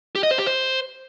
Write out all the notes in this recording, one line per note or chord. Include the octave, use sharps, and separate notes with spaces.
G4
D#5
C5
G4
C5